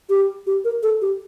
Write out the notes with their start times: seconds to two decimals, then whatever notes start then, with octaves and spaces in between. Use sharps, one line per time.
0.10 G4
0.47 G4
0.65 A#4
0.83 A4
1.02 G4